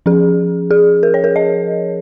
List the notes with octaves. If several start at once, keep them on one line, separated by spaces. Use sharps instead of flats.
F3 C#4 G#4
G#4
A#4
C#5
A#4
D#5